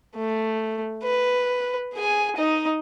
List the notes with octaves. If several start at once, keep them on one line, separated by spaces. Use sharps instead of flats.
A3
B4
G#4 G#5
D#4 D#5